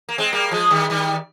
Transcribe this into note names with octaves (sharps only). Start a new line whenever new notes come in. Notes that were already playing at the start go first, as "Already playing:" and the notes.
A#3
G#3 C4
G3 A#3
F3 G#3
D#3 G3
D#3 G3